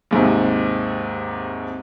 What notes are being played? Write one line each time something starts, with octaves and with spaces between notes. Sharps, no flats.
D#2 G#2 C3